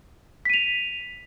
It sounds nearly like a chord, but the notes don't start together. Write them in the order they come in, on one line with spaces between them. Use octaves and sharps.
B6 D#7 F7